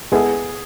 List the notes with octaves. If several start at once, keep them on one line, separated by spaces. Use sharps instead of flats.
G#3 B3 E4 G#4 A4